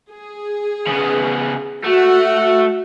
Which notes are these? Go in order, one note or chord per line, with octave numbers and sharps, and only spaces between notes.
G#4
C#3 B3
A3 F#4 F#5